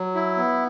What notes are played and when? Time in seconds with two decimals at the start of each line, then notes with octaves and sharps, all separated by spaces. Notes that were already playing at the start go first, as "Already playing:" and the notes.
Already playing: F#3
0.15 E4
0.37 B3